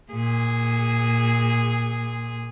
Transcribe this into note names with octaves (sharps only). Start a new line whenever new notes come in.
A#2 G#4